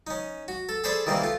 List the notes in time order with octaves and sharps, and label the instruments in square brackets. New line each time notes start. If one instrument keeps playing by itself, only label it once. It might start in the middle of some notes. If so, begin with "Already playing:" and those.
[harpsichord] C#4 D#4
F#4
A4
G#4 A4 C5 D5 B5
D#3 E3 G3 A#3 C4
A3 F4